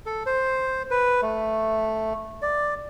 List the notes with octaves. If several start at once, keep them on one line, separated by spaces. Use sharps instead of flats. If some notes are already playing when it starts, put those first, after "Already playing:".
A4
C5
B4
A3
D5